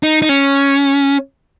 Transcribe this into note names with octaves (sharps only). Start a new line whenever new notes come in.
D#4
D#4
C#4